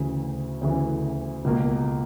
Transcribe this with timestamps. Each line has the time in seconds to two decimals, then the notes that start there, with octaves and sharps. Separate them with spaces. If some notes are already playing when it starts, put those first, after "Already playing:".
Already playing: D2 C#3 E3
0.61 D2 C#3 E3
1.44 C#2 B2 A#3